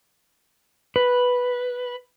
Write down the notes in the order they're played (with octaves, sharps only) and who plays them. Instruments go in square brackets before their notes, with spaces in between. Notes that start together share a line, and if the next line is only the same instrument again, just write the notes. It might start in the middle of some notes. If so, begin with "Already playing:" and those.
[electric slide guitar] B4